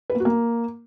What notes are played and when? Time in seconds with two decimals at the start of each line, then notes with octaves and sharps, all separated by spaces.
0.10 B4
0.15 A#3
0.20 F#4
0.25 A#3